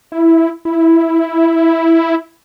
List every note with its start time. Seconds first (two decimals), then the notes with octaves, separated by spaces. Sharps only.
0.12 E4
0.65 E4